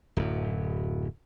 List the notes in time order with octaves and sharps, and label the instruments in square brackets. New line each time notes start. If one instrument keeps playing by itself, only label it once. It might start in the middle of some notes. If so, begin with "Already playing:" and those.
[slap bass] D1 F#2